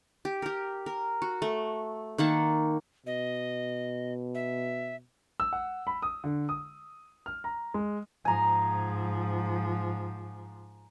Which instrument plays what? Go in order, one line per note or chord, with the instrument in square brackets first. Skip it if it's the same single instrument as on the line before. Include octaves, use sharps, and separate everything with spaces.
[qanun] G4
G4 A#4
A#4
F#4
A3
D#3 A#3 F#5 A5
[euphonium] B2 [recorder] D#5
[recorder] E5
[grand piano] E6
F#5
B5
D#6
D3
D#6
F6
A#5
G#3
[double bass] G#2 F3 [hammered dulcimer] G#5 A#5